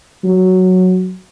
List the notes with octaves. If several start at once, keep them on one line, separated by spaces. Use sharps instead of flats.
F#3